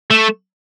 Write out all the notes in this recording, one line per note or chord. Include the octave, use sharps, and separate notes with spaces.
A3